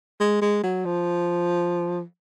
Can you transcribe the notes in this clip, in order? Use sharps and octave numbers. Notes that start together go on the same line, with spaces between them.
G#3
G#3
F#3
F3